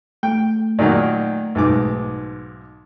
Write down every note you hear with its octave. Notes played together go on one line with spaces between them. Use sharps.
A3 G5
A#2 D#3 F#3
B1 G#2 D6